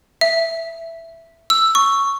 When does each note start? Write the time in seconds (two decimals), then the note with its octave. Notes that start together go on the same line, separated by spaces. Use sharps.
0.21 E5
1.50 E6
1.75 C#6